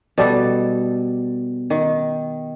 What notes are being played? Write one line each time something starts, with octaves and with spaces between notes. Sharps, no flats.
B2 G3 A4
D#3